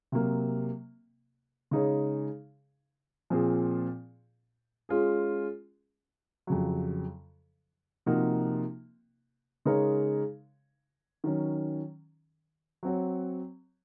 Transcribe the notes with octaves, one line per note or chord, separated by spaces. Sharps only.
C3 F#3 A#3
C#3 G#3 D#4 G#4 C#5
A#2 F3 C4 F4 G#4
G#3 C#4 F4 G#4
F2 C#3 F#3
C3 F3 A#3 D#4 F#4
C#3 G#3 D#4 A#4 C#5
D#3 F#3 C#4
F#3 C4 F#4 C#5